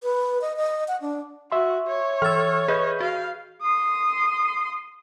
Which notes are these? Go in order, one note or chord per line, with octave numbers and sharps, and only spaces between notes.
B4
D#5
D#5
F#5
D4
F#4 E5 C6
C#5
E3 E6 F6 A6
G#4 B4 D#5 G6
F#4 F5
C6 D#6